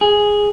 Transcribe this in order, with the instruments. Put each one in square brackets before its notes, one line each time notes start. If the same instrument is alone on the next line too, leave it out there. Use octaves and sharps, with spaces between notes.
[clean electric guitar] G#4